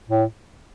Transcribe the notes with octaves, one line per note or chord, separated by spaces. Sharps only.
A2